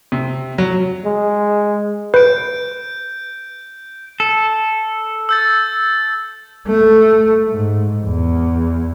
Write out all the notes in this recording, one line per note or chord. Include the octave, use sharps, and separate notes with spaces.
C3
F#3
G#3
B4 G6 D7
A4
E6 G6 A6
A3
G#2
E2